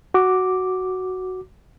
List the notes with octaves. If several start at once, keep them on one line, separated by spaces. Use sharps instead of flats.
F#4 D6